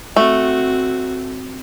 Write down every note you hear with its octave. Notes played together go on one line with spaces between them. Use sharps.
A3 C4 F#4